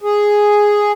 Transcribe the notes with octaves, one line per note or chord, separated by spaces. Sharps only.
G#4